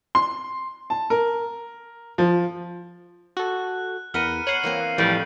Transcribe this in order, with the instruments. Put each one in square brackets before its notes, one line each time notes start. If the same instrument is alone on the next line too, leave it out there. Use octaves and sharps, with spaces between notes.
[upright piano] C6
A5
A#4
F3
[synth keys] F#4 A4 [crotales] F#6
[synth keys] E2 [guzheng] A#4 B4 F#5 [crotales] F6 C#7 D#7
[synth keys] C#5 F#5 [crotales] C7 D#7 F#7
[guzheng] E3 A#3 C4
[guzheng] F2 A2 [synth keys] E3 [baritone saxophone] G3